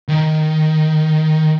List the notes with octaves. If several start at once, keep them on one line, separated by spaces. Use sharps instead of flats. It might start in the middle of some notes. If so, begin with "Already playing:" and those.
D#3